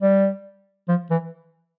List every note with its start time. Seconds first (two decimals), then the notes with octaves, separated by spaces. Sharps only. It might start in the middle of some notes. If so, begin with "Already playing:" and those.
0.02 G3
0.88 F3
1.10 E3